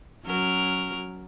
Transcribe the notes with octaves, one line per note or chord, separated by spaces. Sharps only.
F#3 C#4 A#4